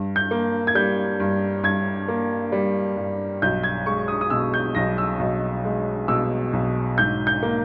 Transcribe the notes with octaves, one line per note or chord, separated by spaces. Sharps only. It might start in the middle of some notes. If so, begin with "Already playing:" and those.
Already playing: G2
G6
A#3
G#6
G3 G6
G2
G2 G#6
A#3
G3
G2
B1 G6
G#6
G#3 C#6
D#6
D#6
B2 E6
G6
B1 A#6
E6
B1
G#3
B2 E6
B1
G#2 G6
G6
A#3